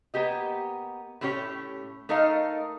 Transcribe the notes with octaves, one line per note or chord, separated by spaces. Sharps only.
A#3 B3 G4 D#5
A2 A3 C#4 G4 C#5
A3 D#4 A4 A#4 D#5 F5